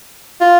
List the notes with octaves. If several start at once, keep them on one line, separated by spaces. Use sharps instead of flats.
F4